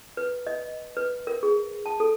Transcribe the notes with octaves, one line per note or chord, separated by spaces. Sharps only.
B4
D#5
B4
A#4
G#4
A5
A4